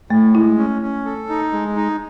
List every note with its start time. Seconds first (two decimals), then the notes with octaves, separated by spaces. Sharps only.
0.10 A2 A3
0.34 G#3 E4
0.57 C#4
0.82 C#4
1.05 A4
1.29 D#4
1.52 G#3
1.76 D#4